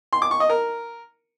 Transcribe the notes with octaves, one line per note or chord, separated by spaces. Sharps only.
C6
D6
C#6
D#5
A#4